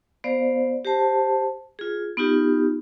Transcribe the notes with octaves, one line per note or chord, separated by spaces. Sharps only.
B3 C5 D5 F5
G4 C5 A5
F4 G#4
B3 D#4 F4 G4